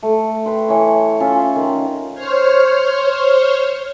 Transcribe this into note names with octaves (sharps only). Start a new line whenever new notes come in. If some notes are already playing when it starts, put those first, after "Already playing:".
A3
B4 G5 C6
E3 C#5
C#4 F4 E5 C6
D#3
C5 C#5 F6